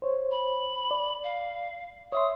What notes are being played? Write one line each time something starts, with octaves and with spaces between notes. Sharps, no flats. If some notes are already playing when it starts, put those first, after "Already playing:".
C5 C#5
B5
D5
F5
C#5 E5 C6 D#6